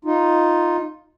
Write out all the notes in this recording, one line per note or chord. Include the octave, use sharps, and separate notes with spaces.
D#4 F4